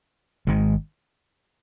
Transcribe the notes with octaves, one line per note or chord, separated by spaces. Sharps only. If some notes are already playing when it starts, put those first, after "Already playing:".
G#1 G#2 D#3 G#3